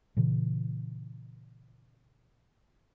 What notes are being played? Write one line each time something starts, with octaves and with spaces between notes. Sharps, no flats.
A#2 C#3 E3